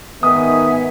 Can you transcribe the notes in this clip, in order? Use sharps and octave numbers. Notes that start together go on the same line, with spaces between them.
G#2 D#3 B3 E5 F#5 G#5 D#6